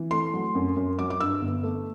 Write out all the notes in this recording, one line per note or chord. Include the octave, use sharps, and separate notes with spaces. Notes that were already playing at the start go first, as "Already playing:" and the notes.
Already playing: E3
A3 C6
F#3
F#2
F#2
F#3 D6
D6
G2 E6
G1
A3